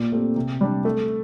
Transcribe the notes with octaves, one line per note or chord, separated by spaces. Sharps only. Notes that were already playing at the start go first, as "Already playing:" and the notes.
Already playing: A#2
A3 C4 G4
C3
G3 D4
A3